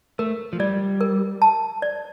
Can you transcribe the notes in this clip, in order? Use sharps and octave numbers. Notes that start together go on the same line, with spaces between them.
A3 A#4
F3
G3 D5
A#4
A5
D5